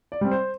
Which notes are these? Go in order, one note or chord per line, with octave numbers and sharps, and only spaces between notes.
D5
G3 C4
C5